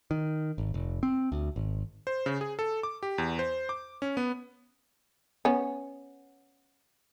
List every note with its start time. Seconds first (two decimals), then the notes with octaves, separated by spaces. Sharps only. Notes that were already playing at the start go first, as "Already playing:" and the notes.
0.11 D#3
0.58 G#1
0.74 F1
1.03 C4
1.32 D2
1.56 G#1
2.07 C5
2.26 C#3
2.41 G#4
2.59 A4
2.83 D6
3.03 G4
3.18 E2
3.39 C5
3.69 D6
4.02 C#4
4.17 B3
5.45 B3 C#4